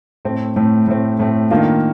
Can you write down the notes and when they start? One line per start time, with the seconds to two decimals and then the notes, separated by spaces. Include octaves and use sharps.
0.25 A2 A3 C4
0.56 A2 A3 C4
0.87 A2 A3 C4
1.19 A2 A3 C4
1.51 D#3 A#3 D4 F4